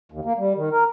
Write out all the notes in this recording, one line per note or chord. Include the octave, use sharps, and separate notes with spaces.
D#2
A#3
G3
D#3
A#4